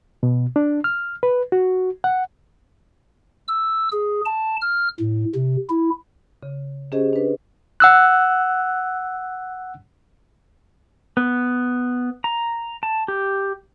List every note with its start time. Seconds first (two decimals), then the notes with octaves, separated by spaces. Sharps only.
0.23 B2
0.56 D4
0.84 F6
1.23 B4
1.52 F#4
2.04 F#5
3.48 E6
3.92 G#4
4.26 A5
4.62 F6
5.00 A2
5.35 C3
5.70 E4
6.43 C#3
6.92 C#4 G4 G#4 C5 D#5
7.13 D4 B4
7.80 F#5 E6 F#6
11.17 B3
12.24 A#5
12.83 A5
13.08 G4